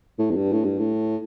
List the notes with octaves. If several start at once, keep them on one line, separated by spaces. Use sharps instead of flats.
A2
E2
G2
A2
G2
A2